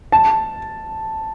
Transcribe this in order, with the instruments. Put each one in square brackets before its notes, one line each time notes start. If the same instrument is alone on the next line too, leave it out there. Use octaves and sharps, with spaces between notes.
[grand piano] A5